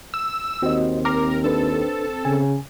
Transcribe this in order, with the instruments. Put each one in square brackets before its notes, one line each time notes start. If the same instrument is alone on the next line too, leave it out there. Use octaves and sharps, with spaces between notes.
[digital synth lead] E6
[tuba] D#2 [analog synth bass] C4 [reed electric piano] F#4 D#5
[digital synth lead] A#4 [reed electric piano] A#5 D6
[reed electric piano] D4 B4 [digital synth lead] A4
[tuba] C#3 [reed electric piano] G#5